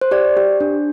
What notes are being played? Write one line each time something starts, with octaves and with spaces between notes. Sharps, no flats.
C5
G4 D5
G4
D4